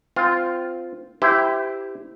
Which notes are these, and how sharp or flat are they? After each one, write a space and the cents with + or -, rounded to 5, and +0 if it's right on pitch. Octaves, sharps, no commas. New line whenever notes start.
C4 -15 F4 +0
E4 +0 G4 +0 C5 -35